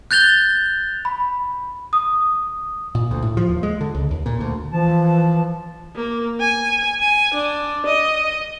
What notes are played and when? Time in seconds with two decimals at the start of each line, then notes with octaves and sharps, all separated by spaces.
0.11 F#6 G6 A6 F7 G7
1.05 B5
1.93 D#6
2.95 A#2
3.11 D2
3.22 A2
3.37 F3
3.49 D#2
3.63 G#3
3.81 D3
3.95 C#2
4.11 D#2
4.26 A#2
4.41 D2
4.72 E3 F3 A5
5.95 A#3
6.40 G#5
7.00 G#5
7.34 D4
7.86 D#5